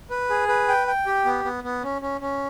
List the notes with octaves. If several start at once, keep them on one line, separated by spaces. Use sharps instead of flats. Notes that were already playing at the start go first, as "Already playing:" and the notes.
B4
G#4
B4
G5
G5
G4
B3
B3
B3
C#4
C#4
C#4